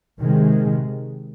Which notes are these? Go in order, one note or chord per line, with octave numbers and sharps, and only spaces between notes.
C3 D#3 G#3